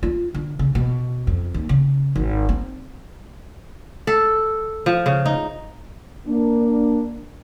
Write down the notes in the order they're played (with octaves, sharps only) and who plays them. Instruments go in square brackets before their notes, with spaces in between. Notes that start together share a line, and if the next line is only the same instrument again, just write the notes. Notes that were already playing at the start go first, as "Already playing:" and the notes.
[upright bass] F4
D3
C#3
B2
F2
D#2
C#3
G#1
C4
[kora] A4
F3
C#3
D#4
[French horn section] A#3 D4